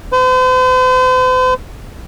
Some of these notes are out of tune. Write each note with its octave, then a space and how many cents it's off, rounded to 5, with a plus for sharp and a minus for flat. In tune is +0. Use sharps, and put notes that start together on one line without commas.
C5 -45